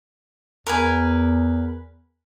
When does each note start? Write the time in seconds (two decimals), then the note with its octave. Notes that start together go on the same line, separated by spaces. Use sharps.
0.67 E2 A#4 B4 G#5